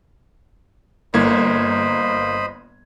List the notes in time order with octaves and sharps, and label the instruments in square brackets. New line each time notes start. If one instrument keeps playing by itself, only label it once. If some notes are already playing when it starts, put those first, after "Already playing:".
[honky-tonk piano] G1 [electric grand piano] A#3 G#6 [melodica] C5 D#5 B5